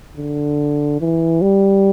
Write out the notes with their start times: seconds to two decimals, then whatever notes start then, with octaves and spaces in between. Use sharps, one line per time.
0.17 D3
1.01 E3
1.42 G3